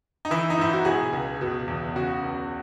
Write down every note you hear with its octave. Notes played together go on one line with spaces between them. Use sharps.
D#4
E3 E4
D#4
G#2 E4
F#4
B2 G#4
C#2
B2
E2
C#3 F#4
C#2